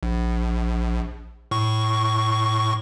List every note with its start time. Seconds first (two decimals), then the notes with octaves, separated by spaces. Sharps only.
0.03 A#1
1.51 A2 C#6